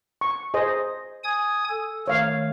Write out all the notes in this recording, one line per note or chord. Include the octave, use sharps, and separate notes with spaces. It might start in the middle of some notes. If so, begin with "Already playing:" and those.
C#6
G#4 C5 D#5
G#5 D#6 G#6
A4
D#3 A3 C#5 F5